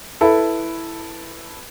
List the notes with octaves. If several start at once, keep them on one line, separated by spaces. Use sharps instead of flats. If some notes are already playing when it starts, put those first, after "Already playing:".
E4 A4 B4